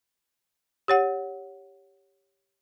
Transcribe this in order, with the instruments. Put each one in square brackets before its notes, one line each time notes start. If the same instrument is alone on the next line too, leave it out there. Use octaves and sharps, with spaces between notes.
[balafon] G4 C#5 F#5